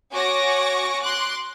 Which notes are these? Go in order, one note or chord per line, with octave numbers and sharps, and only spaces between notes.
F#4 C#5 G#5 C#6 D6 A#6
C6 D6 F#6